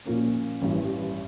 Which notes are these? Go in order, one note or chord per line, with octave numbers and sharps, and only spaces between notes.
A#2 F3 A#3 C#4
A1 G2 E3